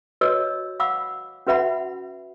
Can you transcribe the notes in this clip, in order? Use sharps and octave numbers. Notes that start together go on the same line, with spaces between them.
F#4 B4 C#5 D#5 E6
F5 F#5 B5 D6 E6
C#4 F#4 B4 E5 F#5 B5